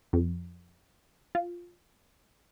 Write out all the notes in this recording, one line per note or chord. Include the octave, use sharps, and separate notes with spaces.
F2
F4